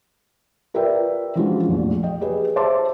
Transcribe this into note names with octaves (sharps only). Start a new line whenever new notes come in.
F4 A#4 B4 D5 E5 G5
E3 F3 G#3 C#4 D4 F#4
F1 A#1
D#5 G5
G4 G#4 B4
C5 E5 A5 C6 D6